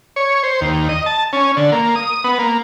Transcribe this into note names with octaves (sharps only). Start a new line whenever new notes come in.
C#5
C5
D#2
D#5
A5
C#4
D3
A#3
D#6
B3
A#3